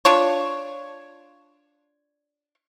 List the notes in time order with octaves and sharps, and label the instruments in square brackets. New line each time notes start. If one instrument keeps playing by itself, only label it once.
[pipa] D4 F4 C#5